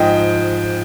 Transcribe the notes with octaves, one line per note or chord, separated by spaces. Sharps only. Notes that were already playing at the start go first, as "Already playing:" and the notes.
Already playing: G#2 F3 D#5 G5